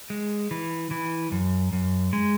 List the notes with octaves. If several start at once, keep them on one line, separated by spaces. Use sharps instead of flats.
G#3
E3
E3
F#2
F#2
G#3